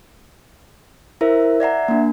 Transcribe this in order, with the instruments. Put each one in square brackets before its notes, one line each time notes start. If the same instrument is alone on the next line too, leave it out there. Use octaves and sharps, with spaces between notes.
[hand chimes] E4 A#4 C5 E5
D5 E5 F#5 A#5
A#3 D4